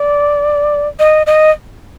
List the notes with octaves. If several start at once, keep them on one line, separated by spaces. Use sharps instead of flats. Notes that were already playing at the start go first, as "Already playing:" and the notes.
Already playing: D5
D#5
D#5